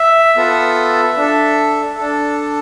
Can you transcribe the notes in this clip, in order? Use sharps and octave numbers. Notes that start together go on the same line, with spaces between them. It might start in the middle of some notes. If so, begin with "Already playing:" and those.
Already playing: E5
B3 F4 A4
D4 A4
D4 A4